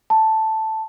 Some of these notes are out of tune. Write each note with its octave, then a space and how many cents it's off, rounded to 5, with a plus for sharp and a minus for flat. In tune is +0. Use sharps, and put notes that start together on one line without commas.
A5 +0